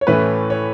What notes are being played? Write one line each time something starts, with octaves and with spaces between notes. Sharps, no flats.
C#5
A2 E3 A3 C#4 B4
C#5